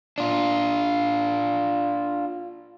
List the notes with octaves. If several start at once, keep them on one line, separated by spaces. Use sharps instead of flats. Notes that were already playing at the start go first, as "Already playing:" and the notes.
D4 F4